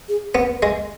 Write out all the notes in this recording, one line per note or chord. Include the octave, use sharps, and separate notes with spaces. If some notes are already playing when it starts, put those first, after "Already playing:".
G#4
B3 B4
G#3